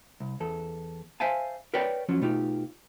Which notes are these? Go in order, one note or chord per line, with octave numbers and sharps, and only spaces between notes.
C2
E2 A4
C5 E5 F5 G#5 A5
A#4 B4 C#5 D5 G5
F2 F3 F#3 C#4
B2 A3 D#4 F4 G4